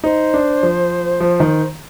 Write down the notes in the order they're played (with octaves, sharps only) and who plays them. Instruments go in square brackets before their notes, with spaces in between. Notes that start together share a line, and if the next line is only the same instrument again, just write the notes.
[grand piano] D#4 [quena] C5
[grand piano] D4
F3
F3
D#3